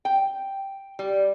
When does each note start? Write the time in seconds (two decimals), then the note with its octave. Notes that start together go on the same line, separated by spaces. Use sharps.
0.05 G5
0.99 G3